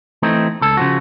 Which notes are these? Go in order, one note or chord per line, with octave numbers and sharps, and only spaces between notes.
E3 A3 C4 D#4
C#2 A4
C#3 F3 F#4